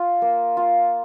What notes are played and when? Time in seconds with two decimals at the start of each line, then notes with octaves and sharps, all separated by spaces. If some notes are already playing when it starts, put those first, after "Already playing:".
Already playing: F4
0.22 A#3
0.57 F4